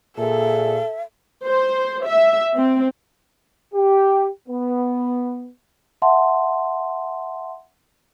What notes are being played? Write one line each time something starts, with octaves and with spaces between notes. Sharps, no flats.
A#2 G#4 A4 E5
C5
E5
C4
G4
B3
E5 F#5 A5 C6